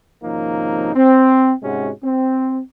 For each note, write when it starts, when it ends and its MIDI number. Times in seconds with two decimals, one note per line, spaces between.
0.23 0.92 32
0.23 0.92 48
0.23 0.92 53
0.23 0.92 58
0.23 0.92 61
0.23 0.92 63
0.95 1.53 60
1.62 1.89 44
1.62 1.89 48
1.62 1.89 56
1.62 1.89 61
1.62 1.89 66
2.03 2.60 60